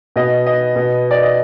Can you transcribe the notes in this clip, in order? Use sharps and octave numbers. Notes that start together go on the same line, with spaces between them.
B2 D#5
D#5
B2
D5
D#5